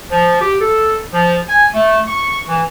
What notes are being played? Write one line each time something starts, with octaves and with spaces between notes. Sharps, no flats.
F3
G4
A4
F3
G#5
A3
C#6
E3